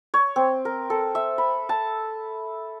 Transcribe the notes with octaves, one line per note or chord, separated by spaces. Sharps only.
C#5
C4
A#4
A4
E5
B5
A5